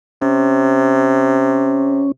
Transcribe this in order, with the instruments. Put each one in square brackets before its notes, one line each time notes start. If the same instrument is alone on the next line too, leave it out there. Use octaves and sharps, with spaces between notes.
[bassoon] C3 [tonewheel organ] C#4